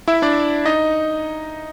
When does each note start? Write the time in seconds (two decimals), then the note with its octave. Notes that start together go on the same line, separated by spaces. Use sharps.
0.08 E4 E5
0.22 D4 D5
0.66 D#4 D#5